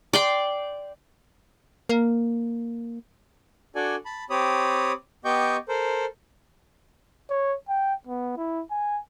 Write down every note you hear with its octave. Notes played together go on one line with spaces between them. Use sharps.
D5 G5 C6
A#3
D4 F#4 A4 D5 G#5
A5 B5
C4 G4 C#5 B5 D#6
B3 G4 D#5 G5 C#6 G6
A4 A#4 C5
C#5
G5
B3
E4
G#5